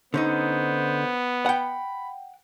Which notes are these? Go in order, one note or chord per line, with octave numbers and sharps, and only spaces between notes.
D3 B3 C#4 D#4 C5
F#5 G5 B5